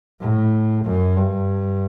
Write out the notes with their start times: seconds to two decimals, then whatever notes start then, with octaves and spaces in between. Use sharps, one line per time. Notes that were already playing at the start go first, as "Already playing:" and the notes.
0.21 A2
0.85 F#2
1.16 G2